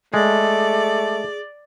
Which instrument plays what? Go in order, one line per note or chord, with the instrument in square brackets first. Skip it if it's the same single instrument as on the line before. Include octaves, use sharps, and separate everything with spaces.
[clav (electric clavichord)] G#3 [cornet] A3 [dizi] G#4 [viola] D5